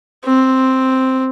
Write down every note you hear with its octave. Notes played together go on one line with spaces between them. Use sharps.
C4